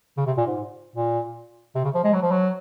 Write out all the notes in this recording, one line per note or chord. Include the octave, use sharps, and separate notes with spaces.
C#3
C3
A#2
G#2
A#2
C3
C#3
F3
G#3
F#3
F3
F#3